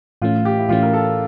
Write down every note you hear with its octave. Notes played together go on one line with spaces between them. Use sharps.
A2 E3 A3 C#4 F4
G4
E4
A2 E3 A3 C#4 F4
A#4
A4